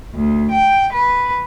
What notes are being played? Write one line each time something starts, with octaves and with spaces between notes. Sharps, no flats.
D2
G5
B4